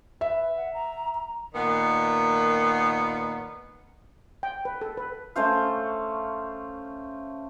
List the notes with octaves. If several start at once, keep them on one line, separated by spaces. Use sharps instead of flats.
B4 E5
F#5
A#5
A#5
A#2 D#3 B3
G5
B4
A4
B4
A3 C#4 C5 F5